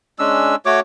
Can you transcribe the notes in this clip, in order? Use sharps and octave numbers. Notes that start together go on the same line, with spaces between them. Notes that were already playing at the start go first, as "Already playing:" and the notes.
G#3 C#4 D4 E6
A3 F#4 C#5 D6